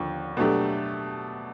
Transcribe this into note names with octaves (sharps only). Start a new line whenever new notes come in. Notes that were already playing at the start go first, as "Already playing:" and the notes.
Already playing: D#2 D3 F3
B2 F#3 A3 D4 G4